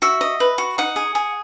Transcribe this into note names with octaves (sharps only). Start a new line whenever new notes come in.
F#4 E5
D#5
B4
F#4
D#4 F#5
G#4
G#4